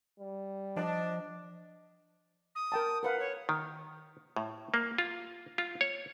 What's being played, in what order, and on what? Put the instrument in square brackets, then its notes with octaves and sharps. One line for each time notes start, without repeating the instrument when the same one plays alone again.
[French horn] G3
[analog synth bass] F3 [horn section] D4 [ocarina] D#5
[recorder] D#6
[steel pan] A#4 G5 A5
[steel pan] A#4 B4 F5 [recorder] F#5
[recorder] C#5
[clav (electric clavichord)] D#3
A2
A#3
F4
F4
C#5